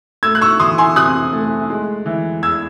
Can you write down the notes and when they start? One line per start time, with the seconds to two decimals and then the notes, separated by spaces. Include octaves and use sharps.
0.23 A3 E6 G#6
0.35 F#6
0.41 C#6 E6
0.60 E3 C6 D#6
0.78 G#5 C6
0.96 C3 D#6 F#6
1.33 A3
1.70 G#3
2.06 E3
2.42 E2 E6 G#6